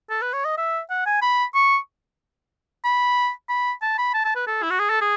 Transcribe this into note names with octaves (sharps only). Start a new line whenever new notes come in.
A4
B4
C#5
D#5
E5
F#5
G#5
B5
C#6
B5
B5
A5
B5
A5
A5
B4
A4
E4
F#4
G#4
A4
G#4